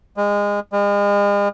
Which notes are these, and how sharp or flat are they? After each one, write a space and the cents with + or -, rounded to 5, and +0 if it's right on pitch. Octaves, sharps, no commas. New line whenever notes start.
G#3 -25
G#3 -40